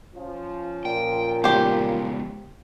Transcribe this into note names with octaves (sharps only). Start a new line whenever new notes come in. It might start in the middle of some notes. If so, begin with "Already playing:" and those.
F3 C#4 F4
A#2 G5
C#3 G#3 B3 G4 C5